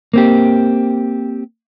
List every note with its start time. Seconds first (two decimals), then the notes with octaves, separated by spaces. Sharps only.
0.14 A#3 C4 G4